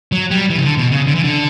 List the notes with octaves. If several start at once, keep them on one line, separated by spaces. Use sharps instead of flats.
F#3
G3
E3
C#3
D3
B2
C#3
D3
E3
D3